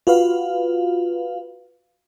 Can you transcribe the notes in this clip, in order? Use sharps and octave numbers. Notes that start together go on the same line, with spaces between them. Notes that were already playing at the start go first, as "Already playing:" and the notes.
F4 F#4 B4 F5